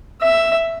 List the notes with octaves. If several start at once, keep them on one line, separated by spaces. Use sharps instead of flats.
E5